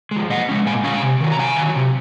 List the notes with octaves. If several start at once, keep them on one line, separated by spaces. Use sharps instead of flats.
F3 G#3
A#2 D#5 F#5
G#3 C#4
A#2 F5 G#5
G#3 C#4 F5 G#5
C3
D#3 F#3
A#5
C3 F5 G#5
D#3 F#3
C3